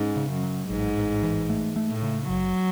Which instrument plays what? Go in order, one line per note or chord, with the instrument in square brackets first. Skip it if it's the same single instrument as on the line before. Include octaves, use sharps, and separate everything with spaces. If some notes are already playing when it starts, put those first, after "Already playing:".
Already playing: [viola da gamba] G#2 [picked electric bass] C#4
[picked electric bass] C#3
[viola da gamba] F#2
[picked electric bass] F#3
[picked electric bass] A1 [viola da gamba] G#2
[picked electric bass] A1
E3
A3
A3
[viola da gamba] A2
[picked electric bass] C#3
[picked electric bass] F#1 [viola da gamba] F#3